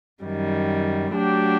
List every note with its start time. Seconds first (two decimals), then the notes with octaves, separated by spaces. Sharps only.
0.22 F#2 D#3 G3
1.14 F#3 A3 D4 F#4 G4